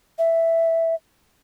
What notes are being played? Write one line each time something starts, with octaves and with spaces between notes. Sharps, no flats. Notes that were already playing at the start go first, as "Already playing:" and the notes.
E5